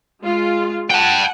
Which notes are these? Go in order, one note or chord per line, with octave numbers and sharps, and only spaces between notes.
G#3 F4
F#5 G5 A5